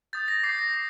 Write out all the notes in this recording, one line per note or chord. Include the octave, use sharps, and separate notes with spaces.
D#6 G6 A6
A#6
D6 G6 C7
A#6
D6 C7